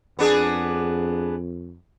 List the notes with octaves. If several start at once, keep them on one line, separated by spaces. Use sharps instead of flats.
F2 B3 D4 G#4